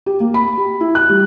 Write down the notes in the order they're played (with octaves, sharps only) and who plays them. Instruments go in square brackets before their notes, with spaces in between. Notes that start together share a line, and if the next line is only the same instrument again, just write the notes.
[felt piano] G4
A#3
B5
G4
E4
F#6
G3